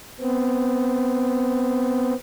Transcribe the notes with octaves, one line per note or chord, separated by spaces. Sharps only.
B3 C4